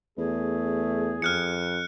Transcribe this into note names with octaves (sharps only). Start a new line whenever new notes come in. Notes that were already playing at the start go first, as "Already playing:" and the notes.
E2 A3 G#4
F2 F6 F#6 C#7